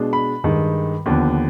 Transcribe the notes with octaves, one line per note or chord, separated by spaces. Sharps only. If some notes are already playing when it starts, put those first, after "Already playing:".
Already playing: B2 G#3 D4
B5
G2 D#3 G#3
D#2 D3 F3 B3